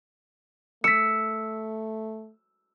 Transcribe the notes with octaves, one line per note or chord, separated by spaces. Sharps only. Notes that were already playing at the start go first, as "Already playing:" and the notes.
A3 E6 B6 C#7